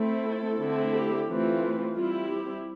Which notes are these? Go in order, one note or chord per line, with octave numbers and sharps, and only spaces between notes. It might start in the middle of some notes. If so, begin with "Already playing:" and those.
Already playing: A3 C4 E4
A4
D3 A3 C4 E4
G4
E3 A3 C4 F4
G3 C4 E4 F4
G4